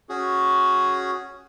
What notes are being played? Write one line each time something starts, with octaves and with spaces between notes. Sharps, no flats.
C#4 F#4 G#4